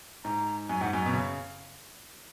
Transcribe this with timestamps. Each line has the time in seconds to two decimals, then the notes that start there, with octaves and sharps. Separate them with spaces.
0.24 G#2 A#5
0.69 F#2 G#5
0.81 G#2 F#5
0.93 F#2 G#5
1.06 B2
1.14 C#3